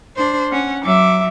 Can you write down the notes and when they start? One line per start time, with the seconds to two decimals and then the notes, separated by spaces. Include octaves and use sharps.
0.17 D4 C5
0.52 C#4 F#5
0.83 F#3 E5 D6